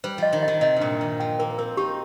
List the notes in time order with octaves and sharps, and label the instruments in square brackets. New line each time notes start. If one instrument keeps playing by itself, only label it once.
[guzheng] G3 [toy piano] C5
[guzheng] F3 [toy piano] D#5
[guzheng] D#3
[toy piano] D#5
[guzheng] D#3
[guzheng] C3 [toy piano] D#5
[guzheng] G2 A#2 [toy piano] A#5
[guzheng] D#3 [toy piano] A#5
[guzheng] F3 [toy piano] G5
[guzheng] A#3 [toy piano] A#4
[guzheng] C4 [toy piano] A#4
[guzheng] D#4 [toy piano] G4